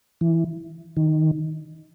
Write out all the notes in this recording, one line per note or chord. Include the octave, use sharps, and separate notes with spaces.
E3
D#3